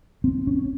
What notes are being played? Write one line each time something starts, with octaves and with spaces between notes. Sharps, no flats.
C4
C#4